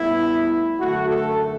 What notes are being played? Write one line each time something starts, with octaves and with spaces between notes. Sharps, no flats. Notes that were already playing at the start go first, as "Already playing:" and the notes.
Already playing: A2 G3 B3 E4
F#2 D3 A3 F#4
A4